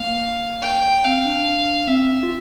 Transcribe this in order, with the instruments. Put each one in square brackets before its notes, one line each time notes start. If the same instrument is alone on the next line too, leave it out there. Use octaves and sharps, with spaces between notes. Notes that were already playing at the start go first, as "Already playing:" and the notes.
Already playing: [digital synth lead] A#3 [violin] F5
[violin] G5
[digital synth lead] C4 [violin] F5
[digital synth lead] D4
[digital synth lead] C4 [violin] E5
[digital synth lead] F4